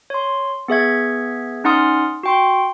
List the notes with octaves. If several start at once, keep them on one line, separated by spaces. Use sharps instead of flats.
C#5 C6
B3 G#4 E5 G#6
C#4 D#4 F#5 C6 D#6 F6
F#4 G5 C6